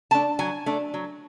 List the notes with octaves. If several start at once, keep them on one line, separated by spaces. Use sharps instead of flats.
A3 D4 A5
F#3 G#5
A3 D4
F#3